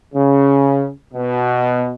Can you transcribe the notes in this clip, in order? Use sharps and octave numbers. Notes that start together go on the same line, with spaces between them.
C#3
B2